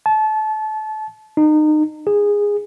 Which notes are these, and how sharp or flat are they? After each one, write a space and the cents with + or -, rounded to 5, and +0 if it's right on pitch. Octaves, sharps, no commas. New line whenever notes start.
A5 -25
D#4 -30
G#4 -15